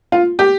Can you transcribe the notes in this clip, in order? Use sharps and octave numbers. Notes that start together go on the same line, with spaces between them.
F4
G4